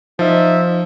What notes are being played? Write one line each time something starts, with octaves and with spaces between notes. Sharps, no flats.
F3 D#4 E5